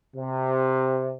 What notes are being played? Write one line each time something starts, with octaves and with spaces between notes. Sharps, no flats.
C3